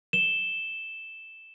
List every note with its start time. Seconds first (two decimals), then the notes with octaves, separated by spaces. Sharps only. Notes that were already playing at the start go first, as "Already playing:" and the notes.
0.13 E7 G7